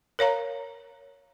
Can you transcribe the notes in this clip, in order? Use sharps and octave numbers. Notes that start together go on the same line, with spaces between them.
A#4 C#5 F5 A#5